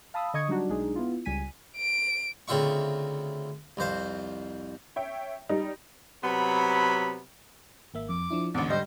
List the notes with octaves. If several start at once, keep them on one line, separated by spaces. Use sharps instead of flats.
F5 A5 B5 D#6 E6
D3 D#5 C#6 D#6 G#6 C#7
F#3 G3 D4 D#4 F#4
B1 G#3 D4 D#4 G#4
B3 E4 F4
C#2 G3 G#5 B6 D#7
D7
D2 C#3 C4 F4 E5 C#6
C2 F2 C5 F5
C#5 E5 G5
G3 D#4
C3 F#3 B3 B5
G#1 A#3 E5
F2 D6
F3 D4 E4
A1 E2 G#2 D3 D5
G3 C5 D#5